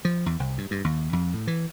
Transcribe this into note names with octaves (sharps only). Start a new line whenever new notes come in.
F3
E2
C2
G2
G2
D#2
F2
A2
E3